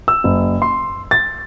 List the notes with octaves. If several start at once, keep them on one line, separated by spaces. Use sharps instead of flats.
E6
F#1
C6
A6